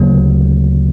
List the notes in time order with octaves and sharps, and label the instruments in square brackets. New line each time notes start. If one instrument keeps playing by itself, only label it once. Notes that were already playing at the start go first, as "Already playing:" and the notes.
Already playing: [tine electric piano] D2 C#3 F#3 A#3